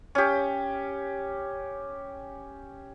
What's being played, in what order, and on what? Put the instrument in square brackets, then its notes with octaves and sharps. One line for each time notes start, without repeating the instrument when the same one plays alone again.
[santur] C#4 G4